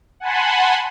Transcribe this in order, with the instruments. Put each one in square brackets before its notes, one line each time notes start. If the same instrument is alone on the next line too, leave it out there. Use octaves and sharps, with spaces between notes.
[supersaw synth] F#5 G#5 A5 B5 C6